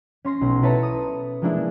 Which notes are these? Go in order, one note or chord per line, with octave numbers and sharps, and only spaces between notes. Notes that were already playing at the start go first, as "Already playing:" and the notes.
C#4 C6 A#6 C7
B1
E4 A4 B4 C#5 A5 A#5
D#6
F3 G#3 A#3 D4 E4